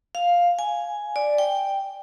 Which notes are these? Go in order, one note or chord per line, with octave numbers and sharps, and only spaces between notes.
F5
G#5
D5
G5